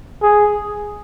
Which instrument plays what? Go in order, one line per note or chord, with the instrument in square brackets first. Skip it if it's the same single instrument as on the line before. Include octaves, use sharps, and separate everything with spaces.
[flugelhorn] G#4